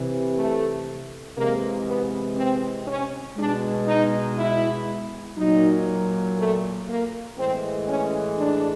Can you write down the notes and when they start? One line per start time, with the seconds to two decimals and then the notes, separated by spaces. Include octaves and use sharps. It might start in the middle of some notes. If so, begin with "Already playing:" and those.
Already playing: C3 E3
0.37 A3
1.36 C3 E3 G#3 A#3
1.87 B3
2.37 C4
2.87 C#4
3.37 B2 G#3 D4
3.87 D#4
4.37 E4
5.38 A#2 F#3 D#4
6.38 A3
6.88 A#3
7.38 A2 E3 G#3 C4
7.88 C#4
8.38 D4